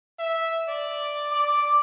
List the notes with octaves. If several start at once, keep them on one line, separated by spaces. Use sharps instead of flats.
E5
D5
D6